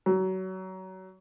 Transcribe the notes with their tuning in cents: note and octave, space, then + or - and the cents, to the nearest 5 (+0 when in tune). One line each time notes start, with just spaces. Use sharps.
F#3 +25